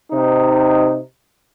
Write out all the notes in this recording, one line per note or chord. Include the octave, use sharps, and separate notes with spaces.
C3 D#4